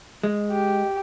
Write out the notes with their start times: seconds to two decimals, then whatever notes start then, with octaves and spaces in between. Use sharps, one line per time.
0.23 G#3
0.52 G4